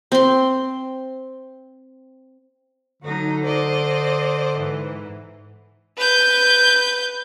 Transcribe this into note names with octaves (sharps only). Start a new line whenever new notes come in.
C4 C6
D3 F#3 D#4
C5 D5 D#5
G#2 E3
B4 G6